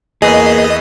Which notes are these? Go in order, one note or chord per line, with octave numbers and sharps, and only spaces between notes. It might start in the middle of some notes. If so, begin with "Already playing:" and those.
E2 A#3 G#4 B4 D#5